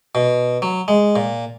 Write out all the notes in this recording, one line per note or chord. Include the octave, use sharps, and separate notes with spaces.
B2
F#3
G#3
A#2